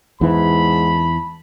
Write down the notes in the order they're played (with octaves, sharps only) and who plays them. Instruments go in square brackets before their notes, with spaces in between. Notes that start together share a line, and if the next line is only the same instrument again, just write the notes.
[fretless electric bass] E2 E3 [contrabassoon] G#2 [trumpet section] A5 B5